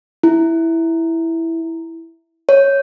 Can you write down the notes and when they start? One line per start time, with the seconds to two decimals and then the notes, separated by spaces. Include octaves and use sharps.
0.23 E4
2.49 C#5